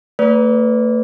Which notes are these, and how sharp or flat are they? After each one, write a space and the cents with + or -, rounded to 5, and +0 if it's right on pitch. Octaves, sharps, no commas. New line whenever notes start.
A3 +35 B4 +15 D5 -30